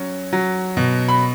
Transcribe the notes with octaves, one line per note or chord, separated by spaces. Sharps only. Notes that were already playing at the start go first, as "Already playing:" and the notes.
Already playing: F#3 C#4
F#3
B2
B5